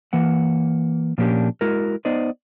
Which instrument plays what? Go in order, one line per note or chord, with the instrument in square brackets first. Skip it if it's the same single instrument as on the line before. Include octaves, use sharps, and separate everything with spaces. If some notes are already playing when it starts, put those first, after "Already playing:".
[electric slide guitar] E3 A#3 F#5
A#2 F3 A#3 C#4 D4 G4
G#3 E4 F#4 A#4
B3 D#4 C5 D5 D#5